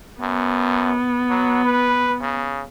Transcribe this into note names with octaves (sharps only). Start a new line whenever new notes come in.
F#2 B3
F#3
B4
C#3